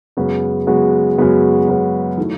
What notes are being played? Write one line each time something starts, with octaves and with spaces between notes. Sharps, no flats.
F#2 C#3 G#3 B3 F#4
F#2 C#3 G#3 B3 F#4
F#2 C#3 G#3 B3 F#4
F#2 C#3 G#3 B3 F#4
D#3 F#3 A3 E4